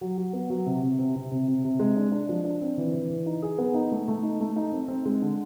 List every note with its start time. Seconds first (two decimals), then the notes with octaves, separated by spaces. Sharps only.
0.01 F#3
0.18 F#3
0.33 B3
0.50 F#3
0.66 C3
0.83 C3
0.99 C3
1.16 C3
1.31 C3
1.48 C3
1.64 C3
1.79 G#3
1.97 D4
2.12 D4
2.29 F3
2.45 D4
2.61 C4
2.77 E3
2.94 E3
3.10 E3
3.26 D#4
3.42 G#4
3.58 B3
3.74 D#4
3.92 A3
4.08 A3
4.23 D#4
4.41 A3
4.56 D#4
4.72 C4
4.88 C4
5.05 G#3
5.22 D3